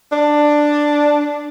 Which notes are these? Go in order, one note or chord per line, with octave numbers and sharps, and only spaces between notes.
D4